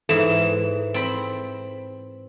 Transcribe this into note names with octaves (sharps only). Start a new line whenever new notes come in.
G#2 E3 A4 E7
C4 B5